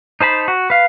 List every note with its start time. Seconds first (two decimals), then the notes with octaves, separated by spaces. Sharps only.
0.21 D#4 C5 A5 B5
0.48 F#4
0.70 B4 F5